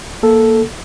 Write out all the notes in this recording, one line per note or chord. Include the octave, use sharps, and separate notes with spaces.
A#3 A4